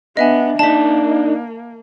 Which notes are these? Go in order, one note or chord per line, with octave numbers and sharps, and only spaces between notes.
B3 D4 D#5 E5 G#5
A#3 D4 D#4 A5 B6